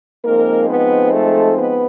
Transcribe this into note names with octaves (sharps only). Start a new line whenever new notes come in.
F3 G#3 A#3 C4 D#4 A#4
B3 B4
A3 A4
B3 B4